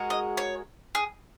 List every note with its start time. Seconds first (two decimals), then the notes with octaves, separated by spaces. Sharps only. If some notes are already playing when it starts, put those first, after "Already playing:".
Already playing: G#3 F#4 A#4
0.10 D#5
0.37 C#5
0.95 G#4